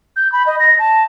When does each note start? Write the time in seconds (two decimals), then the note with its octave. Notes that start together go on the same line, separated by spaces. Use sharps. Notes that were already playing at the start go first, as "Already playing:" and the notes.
0.16 G6
0.32 B5
0.46 D#5
0.60 A#6
0.79 A5